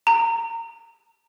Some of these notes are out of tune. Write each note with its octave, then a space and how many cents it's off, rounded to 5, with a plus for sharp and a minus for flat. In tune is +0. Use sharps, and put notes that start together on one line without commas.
A#5 -20